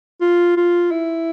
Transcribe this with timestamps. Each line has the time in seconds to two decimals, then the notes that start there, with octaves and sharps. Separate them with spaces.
0.21 F4
0.57 F4
0.91 E4